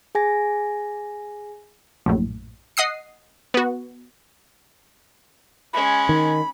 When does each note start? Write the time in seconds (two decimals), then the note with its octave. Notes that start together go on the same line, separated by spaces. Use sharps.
0.15 G#4 G#5 A#6
2.06 A#1 F#2 A2
2.77 D#5 F#5 D#6 C7
3.54 B3 F#4
5.73 G#3 C#4 B5
6.09 D#3